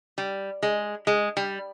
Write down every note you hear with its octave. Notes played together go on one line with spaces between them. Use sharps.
G3
G#3
G#3
G3